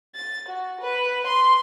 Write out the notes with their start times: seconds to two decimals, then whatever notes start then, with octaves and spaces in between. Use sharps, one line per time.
0.15 A6
0.49 F#4
0.81 B4
1.27 C6